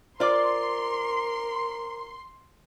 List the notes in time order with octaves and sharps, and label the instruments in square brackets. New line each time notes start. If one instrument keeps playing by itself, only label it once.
[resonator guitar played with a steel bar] F4 D5 [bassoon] A#4 [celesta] C5 D6 [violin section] C6